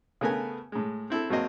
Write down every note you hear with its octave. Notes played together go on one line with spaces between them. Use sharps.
C#3 A3 B3 A#4 B4 G#5
A2 G#3
C4 E4 A4
G#1 F#3 A#3 C4 D#5